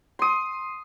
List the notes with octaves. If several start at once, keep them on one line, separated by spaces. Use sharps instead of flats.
C6 D#6